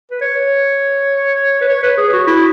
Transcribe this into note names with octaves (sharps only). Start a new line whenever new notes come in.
B4
C#5
B4
C#5
B4
G#4
F#4
E4